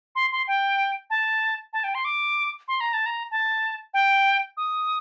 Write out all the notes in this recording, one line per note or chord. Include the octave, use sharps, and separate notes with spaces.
C6
C6
G5
A5
A5
G5
C6
D6
C6
A#5
A5
A#5
A5
G5
D#6